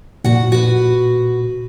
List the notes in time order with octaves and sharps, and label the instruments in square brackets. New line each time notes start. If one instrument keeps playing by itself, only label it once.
[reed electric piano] A#2 [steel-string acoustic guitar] F#4 F#5
[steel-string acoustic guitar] F#4 B4